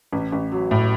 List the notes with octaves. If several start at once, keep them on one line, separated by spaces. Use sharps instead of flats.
A1
A1
F#3
A2